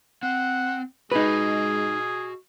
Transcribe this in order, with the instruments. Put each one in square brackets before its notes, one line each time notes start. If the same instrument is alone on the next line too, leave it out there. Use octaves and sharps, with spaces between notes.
[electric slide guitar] C4 [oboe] F#5
[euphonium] G#3 [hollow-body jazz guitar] D#4 B4 [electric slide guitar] F#4 D#5 [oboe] G#4